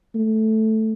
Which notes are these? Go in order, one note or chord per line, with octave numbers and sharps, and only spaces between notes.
A3